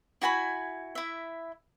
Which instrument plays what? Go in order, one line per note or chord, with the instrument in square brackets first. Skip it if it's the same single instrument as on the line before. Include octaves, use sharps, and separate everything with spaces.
[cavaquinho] E4 F#4 G#5 B5
E4 E5